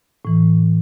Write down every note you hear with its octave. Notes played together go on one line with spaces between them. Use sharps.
A2 E3